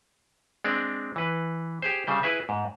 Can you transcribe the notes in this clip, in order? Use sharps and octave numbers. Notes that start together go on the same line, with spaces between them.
G#3 C4 D4 D5
E3 B4
G4 G#4 C5
C#3 G3 C5
E4 G#4 B4 E5
G#2